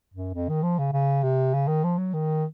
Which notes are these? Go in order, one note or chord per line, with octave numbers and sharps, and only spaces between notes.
F#2
F2
D#3
F3
C#3
C#3
C3
C#3
D#3
F3
F#3
D#3